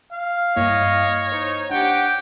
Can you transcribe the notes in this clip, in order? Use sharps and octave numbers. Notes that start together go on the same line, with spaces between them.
F5
G2 A#3 E4 C#5 D#5
D#4 C5
D4 G4 F#5 G5